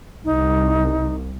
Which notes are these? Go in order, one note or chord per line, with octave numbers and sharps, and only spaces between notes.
C2 D#4